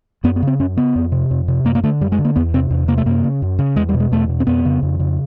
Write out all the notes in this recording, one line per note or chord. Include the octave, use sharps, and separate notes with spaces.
F#2 B3
B3
C#3 C4
F#2 C#4
C#3 B3
F2
C3
F2
C3
F#2 A#3
A#3
D3 A3
F#2 G3
G#3
D3
A#3
E2 B3
C3 C4
E2
C3 A#3
A3
F#2 A#3
C#3
F#2
C#3
E2 G#3
G3
B2
G#3
E2 A3
B2
C4
F2 B3
C#3
F2
C#3